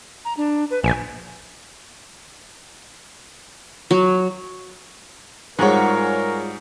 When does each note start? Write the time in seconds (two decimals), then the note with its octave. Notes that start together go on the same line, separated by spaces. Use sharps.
0.25 A#5
0.37 D4
0.71 B4
0.84 A#1 G#5
3.91 F#3
5.59 G#2 G3 F4 F#4 G#4 A#4 C#5